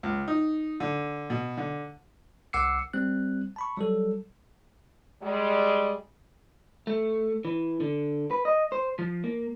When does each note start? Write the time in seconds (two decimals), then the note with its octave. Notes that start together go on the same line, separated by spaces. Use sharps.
0.03 C#2
0.28 D#4
0.80 D3
1.30 B2
1.57 D3
2.53 C2 F#5 D6 E6 C7 C#7
2.94 G3 C4 F#6
3.56 A5 B5 C#6
3.77 F#3 G3 A4
5.23 G3 G#3
6.87 A3
7.45 E3
7.80 D3
8.31 B4
8.45 D#5
8.72 C5
8.99 F3
9.24 A#3